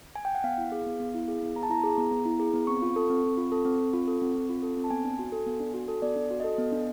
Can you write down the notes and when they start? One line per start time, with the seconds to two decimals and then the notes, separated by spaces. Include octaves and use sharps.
0.16 G#5
0.25 G5
0.35 F#5
0.44 B3 F5
0.58 E4
0.72 G#4
0.86 B3
1.00 B3
1.15 E4
1.28 G#4
1.43 B3
1.55 B3 A#5
1.63 A5
1.70 E4 A#5
1.84 G#4
1.98 B3
2.11 B3
2.25 E4
2.40 G#4
2.54 B3
2.67 C4 C#6
2.82 F4
2.96 A4
3.10 C4
3.24 C4
3.37 F4
3.52 A4
3.65 C4
3.79 C4
3.93 F4
4.08 A4
4.22 C4
4.35 C4
4.49 F4
4.63 A4
4.77 C4
4.84 A5
4.90 B3 G#5
5.05 D4
5.19 F#4
5.32 A4
5.47 B3
5.60 D4
5.74 F#4
5.88 A4
6.02 B3 D5
6.16 D4
6.31 F#4
6.40 A4 D#5
6.58 B3
6.72 D4